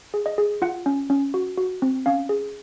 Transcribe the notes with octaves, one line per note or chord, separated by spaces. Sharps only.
G#4
D#5
G#4
F4 F#5
C#4
C#4
F#4
F#4
C4
C#4 F5
G#4